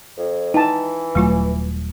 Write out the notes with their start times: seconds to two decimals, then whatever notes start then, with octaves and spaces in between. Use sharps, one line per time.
0.18 F2
0.54 E3 D#4 G5 A5
1.15 D#1 F#3 A3 F4 G#5